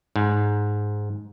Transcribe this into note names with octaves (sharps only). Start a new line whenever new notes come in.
G#2